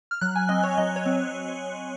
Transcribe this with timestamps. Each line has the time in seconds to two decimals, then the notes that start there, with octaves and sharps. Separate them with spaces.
0.11 F6
0.21 F#3 F#6
0.36 G#5
0.49 C4 D#5
0.63 C#5
0.78 F#3 D#5
0.96 C#5
1.05 C4